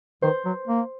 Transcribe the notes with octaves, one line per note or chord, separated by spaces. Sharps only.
D#3 C5
F#3
A#3